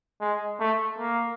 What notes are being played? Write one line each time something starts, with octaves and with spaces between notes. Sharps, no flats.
G#3
A3
A#3